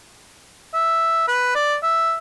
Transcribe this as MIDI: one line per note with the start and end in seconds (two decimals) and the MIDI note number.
0.74 1.26 76
1.28 1.53 71
1.55 1.75 74
1.83 2.17 76